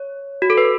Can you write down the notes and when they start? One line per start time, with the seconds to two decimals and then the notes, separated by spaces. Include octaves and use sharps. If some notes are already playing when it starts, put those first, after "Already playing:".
Already playing: C#5
0.42 F#4
0.50 A4
0.58 B4